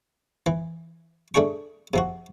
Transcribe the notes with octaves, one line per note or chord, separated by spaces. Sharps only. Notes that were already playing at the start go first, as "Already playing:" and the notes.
E3
A3 D4 G#4 G5 C#6
C3 F3 F#4